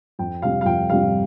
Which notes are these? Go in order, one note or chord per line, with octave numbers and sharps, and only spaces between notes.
F2 G5
C3 G3 F5
F5
F2 G5
C3 G3 F5